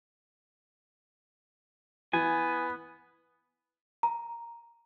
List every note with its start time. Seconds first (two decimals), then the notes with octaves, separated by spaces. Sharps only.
2.13 E3 B3 G#5
4.03 A#5